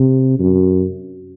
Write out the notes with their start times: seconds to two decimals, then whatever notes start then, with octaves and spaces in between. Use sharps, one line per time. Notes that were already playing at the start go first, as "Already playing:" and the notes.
Already playing: C3
0.39 F#2